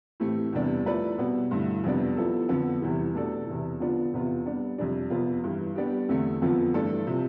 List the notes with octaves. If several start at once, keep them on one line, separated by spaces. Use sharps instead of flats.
A2 E3 A3 C4 G4
E2 C3 G3 B3 D4
F3 A3 E4 B4 D5
B2 G3 B3
G2 D3 A3 E4
F2 C3 G3 B3 D4
F3 B3 E4 A4
F2 D3 F3 B3
E2 C3 E3 G3
B2 A3 D4 A4 D5
E2 C3 E3
D3 F3 B3 D4 F4
E2 C3 E3 B3 F4
G3 B3 D4
F2 C3 G3 D4
F2 C3 F3 B3 F4
G2 E3 G3
G3 B3 D4 G4
E2 D3 A3
F2 D3 F3 B3 F4
G2 E3 A3 D4 A4
C3 F3